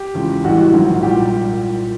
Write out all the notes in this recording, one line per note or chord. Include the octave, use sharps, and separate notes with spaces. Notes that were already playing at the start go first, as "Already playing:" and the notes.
Already playing: G4
E2 C#3 F3 G#3
A1 A2 E3 G3 F#4
A#1 G#2 D#3 F#3
C2 A#2 G3 G4